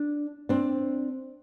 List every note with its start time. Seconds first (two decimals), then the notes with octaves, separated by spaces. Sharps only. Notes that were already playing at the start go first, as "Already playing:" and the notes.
Already playing: D4
0.49 C4 D4